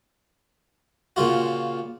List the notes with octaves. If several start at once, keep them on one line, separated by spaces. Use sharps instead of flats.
A#2 C#3 F4 F#4